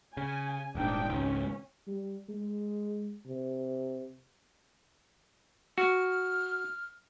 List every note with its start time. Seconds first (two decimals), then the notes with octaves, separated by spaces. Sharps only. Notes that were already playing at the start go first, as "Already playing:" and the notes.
0.17 C#3 G#5
0.75 D#1 G#2 D4 D#4 G5
1.09 G#1 C#2 C#4
1.87 G3
2.29 G#3
3.26 C3
5.78 F#4 F6